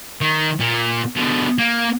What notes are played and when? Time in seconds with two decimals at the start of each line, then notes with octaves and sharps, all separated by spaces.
0.21 D#3
0.60 A#2
1.16 B2 D3
1.58 A#3